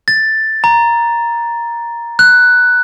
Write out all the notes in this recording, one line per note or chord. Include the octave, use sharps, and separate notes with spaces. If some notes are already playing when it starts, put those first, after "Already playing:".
A6
A#5
F#6